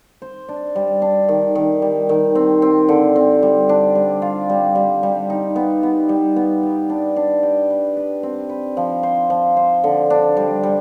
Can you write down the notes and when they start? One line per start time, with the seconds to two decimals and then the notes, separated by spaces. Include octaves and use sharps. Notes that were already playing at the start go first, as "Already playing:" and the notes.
0.22 C5
0.49 D4
0.76 G3
1.02 D4
1.29 D#3
1.55 D#3
1.82 G3
2.09 D#3
2.35 C4
2.62 C4
2.89 D3
3.16 C4
3.43 G3
3.69 D4
3.95 G3
4.22 F4
4.50 G3
4.75 G3
5.03 G3
5.30 D#4
5.56 B3
5.83 B3
6.09 G3
6.36 B3
6.63 G4
6.90 D4
7.16 D4
7.43 G4
7.70 B4
7.97 B4
8.23 C4
8.49 B4
8.77 F3
9.03 C5
9.30 F3
9.57 C5
9.84 D3
10.10 D4
10.37 G3
10.63 G3